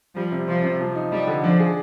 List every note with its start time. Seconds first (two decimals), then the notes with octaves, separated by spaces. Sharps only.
0.16 F3 G3
0.32 C3
0.48 F3 C4
0.64 C3
0.81 F3
0.96 D#4
1.12 G3 D#4
1.27 D3
1.43 F3 D4
1.59 G#4